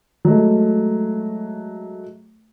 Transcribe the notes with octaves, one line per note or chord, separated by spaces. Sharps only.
F#3 G#3 A3